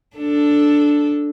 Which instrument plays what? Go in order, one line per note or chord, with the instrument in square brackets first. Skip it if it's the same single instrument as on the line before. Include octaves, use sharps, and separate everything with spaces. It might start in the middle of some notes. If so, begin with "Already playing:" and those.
[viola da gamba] D4 A4